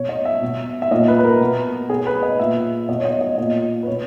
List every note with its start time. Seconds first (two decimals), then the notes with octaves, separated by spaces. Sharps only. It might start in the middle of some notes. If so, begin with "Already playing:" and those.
Already playing: B2 C#5
0.09 D#5
0.25 E5
0.42 B2
0.82 E5
0.91 A#2 D#5
1.08 B4
1.19 B4
1.24 A#4
1.41 B2
1.90 B2 G#4
2.07 B4
2.23 D#5
2.39 A#2 E5
2.89 B2 D#5
3.00 C#5
3.05 D#5
3.21 D#5
3.38 A#2 D#5
3.83 B4
3.87 B2 C#5